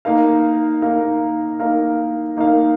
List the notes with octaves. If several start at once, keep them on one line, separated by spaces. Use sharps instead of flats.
A#3 D#4 A#4 F5
A#3 D#4 A#4 F5
A#3 D#4 A#4 F5
A#3 D#4 A#4 F5